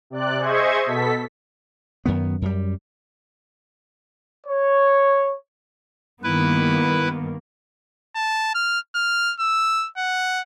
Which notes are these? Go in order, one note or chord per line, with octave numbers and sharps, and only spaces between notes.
C3 D5 F#6
G#4 C5 D#5 E5 C#6 G#6
B2 A4 B6
F#2 D#3 B3
F#2 G3
C#5
G2 D#3 A#3 B3 E4 B4
A5
F6
F6
E6
F#5